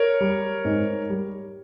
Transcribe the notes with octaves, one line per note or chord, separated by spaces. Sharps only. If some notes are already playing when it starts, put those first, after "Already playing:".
Already playing: A#4 C#5
G3
G#2
G3